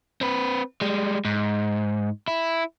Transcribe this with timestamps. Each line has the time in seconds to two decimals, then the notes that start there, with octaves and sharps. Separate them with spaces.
0.21 C4 B4
0.81 G3 G#3
1.25 G#2
2.28 E4